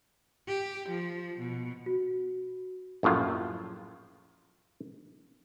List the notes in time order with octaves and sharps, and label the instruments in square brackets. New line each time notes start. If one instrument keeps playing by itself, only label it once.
[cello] G4
F3
B2
[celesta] F#4
[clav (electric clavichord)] A#1 F#2 A2 F4